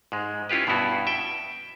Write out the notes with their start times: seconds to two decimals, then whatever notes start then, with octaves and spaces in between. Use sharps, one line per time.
0.12 G#2 G#3
0.49 C#4 E4 F4 G4 B4
0.67 G2 B2 B3 E4 F#4
1.07 E5 G5